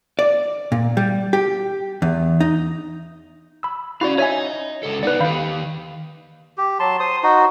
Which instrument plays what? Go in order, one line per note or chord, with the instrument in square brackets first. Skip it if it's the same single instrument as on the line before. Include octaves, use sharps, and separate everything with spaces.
[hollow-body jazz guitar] D5
A#2
G3
G4
E2
D#4
[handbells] B5 E6
[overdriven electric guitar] C#4 F5 [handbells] E4 F#4 D5
[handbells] C#5 E5 G#5 [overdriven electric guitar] D#5 A#5
[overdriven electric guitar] C#2 A4
[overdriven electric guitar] B3 D#4 [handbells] B4 D5
[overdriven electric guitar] D#3 G4 [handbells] F5 B5 G6
[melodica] G4
F#3 A5 C6
C5 C6 D#6
D#4 F#4